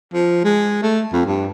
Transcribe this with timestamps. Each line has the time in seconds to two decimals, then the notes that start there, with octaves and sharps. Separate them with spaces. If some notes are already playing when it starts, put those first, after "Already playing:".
0.13 F3
0.44 G#3
0.82 A3
1.13 F2
1.25 G2